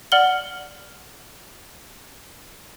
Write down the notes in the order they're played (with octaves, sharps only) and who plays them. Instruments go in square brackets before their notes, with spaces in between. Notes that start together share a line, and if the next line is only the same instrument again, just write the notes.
[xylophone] D5 F#5 F6 F#7 G7